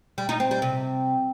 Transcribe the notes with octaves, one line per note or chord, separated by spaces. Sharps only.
G3
D#4
C4
G3
C3